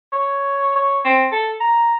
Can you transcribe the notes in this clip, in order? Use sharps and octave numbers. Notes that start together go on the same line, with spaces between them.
C#5
C#5
C4
A4
A#5